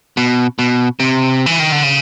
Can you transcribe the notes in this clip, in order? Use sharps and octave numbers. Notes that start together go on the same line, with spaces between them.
B2
B2
C3
E3
D#3
D3
C#3